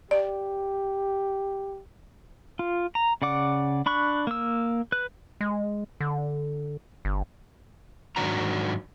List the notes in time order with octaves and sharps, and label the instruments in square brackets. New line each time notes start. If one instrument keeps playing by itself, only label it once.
[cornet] G4 [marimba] D5
[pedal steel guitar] F4
A#5
C#3 D5 F#5 D6
D4 B5 C#6 F#6
A#3 E6
B4 F#6
[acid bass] G#3
D3
G1
[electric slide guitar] G#2 D#3 F#3 D4 F#4 A#5